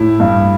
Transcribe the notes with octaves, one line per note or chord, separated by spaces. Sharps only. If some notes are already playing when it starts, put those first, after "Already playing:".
Already playing: A2 E4
G2